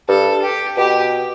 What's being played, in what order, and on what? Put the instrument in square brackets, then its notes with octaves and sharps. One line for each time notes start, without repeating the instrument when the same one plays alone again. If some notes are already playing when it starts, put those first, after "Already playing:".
[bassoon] G2 [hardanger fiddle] A4
[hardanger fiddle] G4
[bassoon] B2 [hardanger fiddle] G4